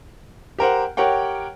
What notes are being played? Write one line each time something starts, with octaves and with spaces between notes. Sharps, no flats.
G4 A#4 C5 F#5
G4 A#4 C#5 F#5 G5